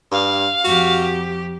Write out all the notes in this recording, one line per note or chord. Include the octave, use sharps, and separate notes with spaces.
G2 F5
F2 F#4 G4